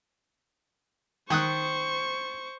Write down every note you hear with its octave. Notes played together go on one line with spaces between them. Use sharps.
D#3 C5 C#6 D#6 F#6